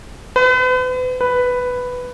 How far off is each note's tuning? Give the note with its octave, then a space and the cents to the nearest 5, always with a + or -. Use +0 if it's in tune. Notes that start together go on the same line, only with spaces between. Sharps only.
B4 +40
B4 +5